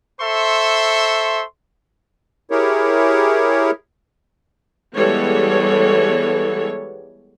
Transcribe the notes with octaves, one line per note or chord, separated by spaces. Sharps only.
A4 C5 E5 C6 C#6
E4 G4 G#4 A#4 C#5
E3 G3 G#3 B3 A4 C#5